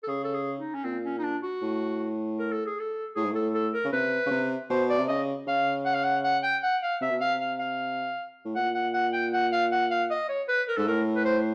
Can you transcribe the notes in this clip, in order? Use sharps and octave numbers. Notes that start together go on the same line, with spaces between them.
A4
C#3 G#4
A4
G#4
D#4
C#4
A#2 C4
C#4
D#4
D4
F#4
A2
A#4
A4
G#4
A4
A2 G#4
G#2
A2 A4
A4
A#4
C#3
C3 B4
C#3
C3
B2 C5
D5
C3
C#3 D#5
C#3 F5
F#5
F5
F#5
F#5
G5
F#5
F5
C3 E5
B2
C3 F5
F5
F5
A2
A#2 F#5
F#5
F#5
G5
F#5
F5
F#5
F5
D#5
C#5
B4
A#4
G#2 A4
A2 A#4
B4
C5